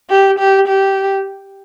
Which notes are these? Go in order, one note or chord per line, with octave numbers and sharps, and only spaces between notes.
G4
G4
G4